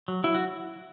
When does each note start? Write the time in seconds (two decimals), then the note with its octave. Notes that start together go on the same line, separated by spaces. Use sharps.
0.08 F#3
0.24 F#3 E4
0.34 F#4